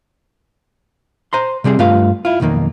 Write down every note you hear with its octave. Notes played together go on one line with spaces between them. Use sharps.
C5 A#5 C6
C3 G3 C4 G#4
G2 A3 F4 B4 F5
E4 F4
B1 F2 D#3 A#3